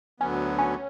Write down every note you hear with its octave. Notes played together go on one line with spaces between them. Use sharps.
D2 D3 F#3 B3 C#4
C#4